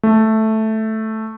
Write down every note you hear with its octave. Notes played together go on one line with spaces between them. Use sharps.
A3